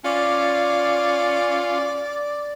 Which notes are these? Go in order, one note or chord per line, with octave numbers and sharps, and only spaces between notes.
C#4 F4 D5